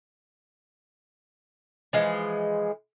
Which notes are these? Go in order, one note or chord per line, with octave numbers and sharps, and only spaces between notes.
E3 F3 G#3